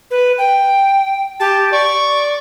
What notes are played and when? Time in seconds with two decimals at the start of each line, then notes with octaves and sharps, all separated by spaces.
0.11 B4
0.38 G5
1.40 G4 A5
1.72 D5 C#6